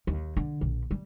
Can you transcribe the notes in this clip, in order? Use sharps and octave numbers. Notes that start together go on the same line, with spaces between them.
D#2
D3
A#1
G3